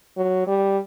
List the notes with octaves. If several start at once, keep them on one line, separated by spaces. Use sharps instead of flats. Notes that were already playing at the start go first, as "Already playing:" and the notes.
F#3
G3